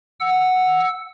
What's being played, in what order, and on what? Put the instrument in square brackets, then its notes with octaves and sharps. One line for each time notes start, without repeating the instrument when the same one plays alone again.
[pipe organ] F#5 E6